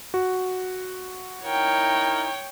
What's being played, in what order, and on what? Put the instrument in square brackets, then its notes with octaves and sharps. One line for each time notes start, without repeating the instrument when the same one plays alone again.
[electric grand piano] F#4
[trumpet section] D#4 E4 A#4 [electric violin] C#5 G5